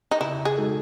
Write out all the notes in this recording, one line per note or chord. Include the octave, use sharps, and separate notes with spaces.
D#4
C#3 E4
G#4
G#3 D#4 F#4 A4